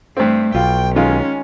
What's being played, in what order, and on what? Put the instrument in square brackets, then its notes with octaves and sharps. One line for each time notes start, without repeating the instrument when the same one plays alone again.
[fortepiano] G2 C4 [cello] A3
[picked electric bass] B1 [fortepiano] F4 [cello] G5
[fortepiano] D#3 G#3 F4 [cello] C#4